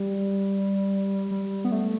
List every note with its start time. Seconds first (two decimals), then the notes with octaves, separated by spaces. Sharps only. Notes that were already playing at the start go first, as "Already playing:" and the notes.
Already playing: G3
1.31 G3
1.65 B3
1.72 A3